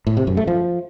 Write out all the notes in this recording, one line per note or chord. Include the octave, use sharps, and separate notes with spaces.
A2
C3
F#2
A3
F3